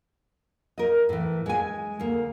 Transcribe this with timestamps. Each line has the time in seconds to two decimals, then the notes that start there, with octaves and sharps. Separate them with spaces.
0.78 A#4 D#5
1.09 A2 E3
1.46 G#3 G#5
1.99 D2 A#3